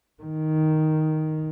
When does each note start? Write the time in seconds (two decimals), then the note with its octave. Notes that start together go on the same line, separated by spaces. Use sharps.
0.23 D#3